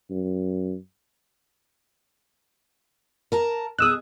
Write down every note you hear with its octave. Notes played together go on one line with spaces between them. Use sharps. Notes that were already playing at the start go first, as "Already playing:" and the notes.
F#2
A#4 A5 A#5
B2 G#4 D#6 E6 F#6